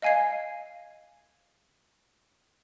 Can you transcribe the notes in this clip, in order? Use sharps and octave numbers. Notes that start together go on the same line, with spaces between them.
D#5 F5 G#5 G#6 C7